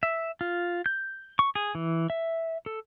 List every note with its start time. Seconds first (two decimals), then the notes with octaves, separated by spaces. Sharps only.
0.03 E5
0.41 F4
0.86 G6
1.39 C#6
1.55 G#4
1.75 E3
2.10 E5
2.66 A4